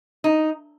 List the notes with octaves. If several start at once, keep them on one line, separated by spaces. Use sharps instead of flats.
D#4